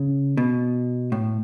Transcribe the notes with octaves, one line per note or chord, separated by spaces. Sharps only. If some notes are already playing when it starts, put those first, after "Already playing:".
Already playing: C#3
B2
A2